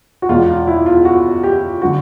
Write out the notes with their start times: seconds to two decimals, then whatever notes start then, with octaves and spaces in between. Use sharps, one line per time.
0.22 F#4
0.29 E2 B2 G#3 F4
0.48 F4
0.67 E4
0.86 F4
1.05 F#4
1.43 G4
1.82 D3 F#3 F#4